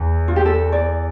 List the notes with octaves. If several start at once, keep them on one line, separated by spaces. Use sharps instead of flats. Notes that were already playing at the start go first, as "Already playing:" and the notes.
Already playing: E2
F4
G4
A4
D5